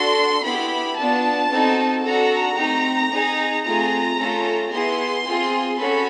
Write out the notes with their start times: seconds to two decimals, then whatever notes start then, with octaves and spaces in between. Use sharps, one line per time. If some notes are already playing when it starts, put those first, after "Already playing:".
Already playing: D4 F#4 A4 C6
0.44 B3 E4 G4 B5
0.97 B3 D4 F4 A5
1.51 C4 D#4 F#4 A4
2.04 D4 F#4 A4 A#5
2.58 A3 C4 D#4 G4
3.10 C4 D#4 G#4
3.64 A3 C4 F4 G#4 A#5
4.17 A3 C#4 F4 A4
4.71 B3 E4 G#4 C6
5.25 C4 F4 G#4
5.77 C#4 F#4 A4 B5